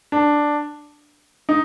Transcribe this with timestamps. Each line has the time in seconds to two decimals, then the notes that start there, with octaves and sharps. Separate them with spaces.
0.12 D4
1.49 D#4